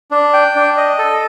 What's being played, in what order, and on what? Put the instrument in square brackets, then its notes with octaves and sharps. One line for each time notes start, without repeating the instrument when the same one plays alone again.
[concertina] D4
G5
D4
D#5
A4